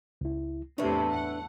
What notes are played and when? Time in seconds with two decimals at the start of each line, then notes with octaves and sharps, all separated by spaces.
0.21 C#2 E4
0.78 E2 A2 C3 A3 D4 E4 B4 E5
1.12 F#5